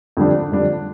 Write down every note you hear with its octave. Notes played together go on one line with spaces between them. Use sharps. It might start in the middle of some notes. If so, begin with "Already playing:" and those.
F2 D3 G3 D4
F2 D3 G3 D4